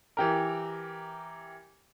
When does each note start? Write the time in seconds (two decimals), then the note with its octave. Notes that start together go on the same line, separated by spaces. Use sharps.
0.17 E3 G4 A#4